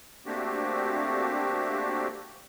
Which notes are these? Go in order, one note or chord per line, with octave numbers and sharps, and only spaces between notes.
A3 A#3 C4 D4 F#4 G4